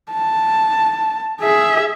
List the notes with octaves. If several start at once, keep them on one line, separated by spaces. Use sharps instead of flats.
A5
G#4 E5